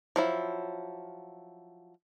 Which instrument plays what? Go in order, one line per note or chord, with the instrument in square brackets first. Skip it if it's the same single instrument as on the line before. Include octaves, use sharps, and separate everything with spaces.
[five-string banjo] F3 F#3 E4